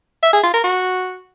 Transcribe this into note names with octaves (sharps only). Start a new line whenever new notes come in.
E5
G#4
F4
A#4
F#4